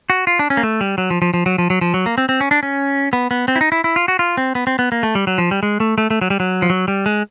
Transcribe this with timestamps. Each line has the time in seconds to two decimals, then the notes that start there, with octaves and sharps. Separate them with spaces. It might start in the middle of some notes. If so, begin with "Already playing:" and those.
0.10 F#4
0.27 F4
0.39 D4
0.50 C#4
0.57 A#3
0.63 A3
0.81 G3
0.98 F#3
1.10 F3
1.22 F3
1.34 F3
1.46 F#3
1.58 F3
1.70 F#3
1.81 F3
1.94 F#3
2.06 A#3
2.18 C4
2.29 C4
2.41 C#4
2.51 D4
2.63 C#4
3.13 B3
3.31 B3
3.48 C4
3.56 E4
3.61 D#4
3.72 E4
3.84 E4
3.96 F4
4.08 F#4
4.19 F4
4.37 C4
4.55 B3
4.67 C4
4.79 B3
4.92 A#3
5.03 A3
5.15 G3
5.27 F#3
5.38 F3
5.51 G3
5.63 G#3
5.80 A3
5.98 A3
6.10 A3
6.21 F#3
6.30 G3
6.40 F#3
6.62 F3
6.70 F#3
6.88 G3
7.06 G#3